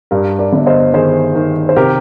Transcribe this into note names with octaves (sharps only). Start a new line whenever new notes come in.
G2 G4 A#4
A#4 D5
G1
C5 D#5
D#3 G#4 C5
D#3
C5
C3 G4 A#4